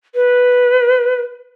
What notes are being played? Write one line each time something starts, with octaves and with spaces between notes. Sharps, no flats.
B4